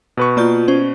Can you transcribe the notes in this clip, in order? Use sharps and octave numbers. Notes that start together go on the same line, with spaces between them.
B2 B4 C#6
A#3 F4 D5 G6
C#4 C5